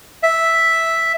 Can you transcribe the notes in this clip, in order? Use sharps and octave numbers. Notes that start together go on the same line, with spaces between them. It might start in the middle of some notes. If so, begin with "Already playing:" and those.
E5